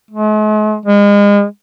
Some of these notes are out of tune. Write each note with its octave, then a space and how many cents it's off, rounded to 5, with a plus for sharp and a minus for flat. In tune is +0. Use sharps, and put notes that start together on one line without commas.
G#3 +45
G#3 -35